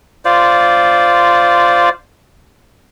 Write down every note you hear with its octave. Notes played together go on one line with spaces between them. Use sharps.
F4 C5 D5